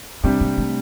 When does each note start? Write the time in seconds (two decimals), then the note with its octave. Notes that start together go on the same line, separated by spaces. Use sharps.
0.24 C3 G3 C4 D4 G4
0.41 A#3
0.58 A3